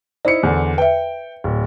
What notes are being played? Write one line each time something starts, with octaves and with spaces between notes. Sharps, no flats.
D#4 E4 C5 D5 C#7
E2 D3
B4 E5 G5
D1